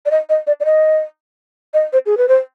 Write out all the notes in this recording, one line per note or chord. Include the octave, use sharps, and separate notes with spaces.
D5
D#5
D#5
D5
D5
D#5
D#5
C5
G#4
B4
C5